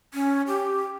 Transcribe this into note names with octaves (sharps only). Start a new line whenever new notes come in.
C#4
G4